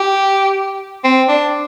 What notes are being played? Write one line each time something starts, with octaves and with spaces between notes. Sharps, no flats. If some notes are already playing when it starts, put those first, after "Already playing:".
Already playing: G4
C4
D4